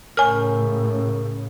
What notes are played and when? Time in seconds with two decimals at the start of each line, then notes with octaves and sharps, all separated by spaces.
0.17 A2 C#3 A#4 C#5 G#5 F6